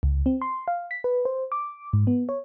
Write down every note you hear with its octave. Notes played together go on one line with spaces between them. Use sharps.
C#2
C4
C6
F5
B6
B4
C5
D6
G#2
B3
C#5